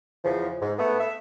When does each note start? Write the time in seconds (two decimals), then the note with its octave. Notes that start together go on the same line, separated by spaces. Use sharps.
0.25 E2 C#3 F3
0.62 G#2
0.79 A3 B3
1.00 E5